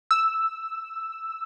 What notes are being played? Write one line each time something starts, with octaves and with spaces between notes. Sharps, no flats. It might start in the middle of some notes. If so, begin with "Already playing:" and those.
E6